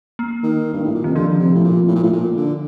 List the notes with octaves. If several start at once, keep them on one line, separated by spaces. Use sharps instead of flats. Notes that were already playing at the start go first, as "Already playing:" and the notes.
A#3
D#3
G2
A2
A#2
C3 D#3
D3 F3
D3
C3
A2
A#2
A2
A#2
A2
A#2
D3